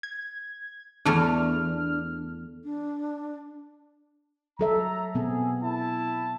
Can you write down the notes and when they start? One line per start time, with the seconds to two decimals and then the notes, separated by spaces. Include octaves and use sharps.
0.03 G#6
1.05 E2 A3 D4 F6
2.64 D4
4.59 F#3 A4 E5 A#5
5.15 B2 B3 C4 G#4 A4
5.63 E4 A5